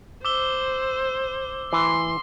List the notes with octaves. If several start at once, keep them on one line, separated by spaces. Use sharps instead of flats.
C5 D6 E6 G7
E3 C6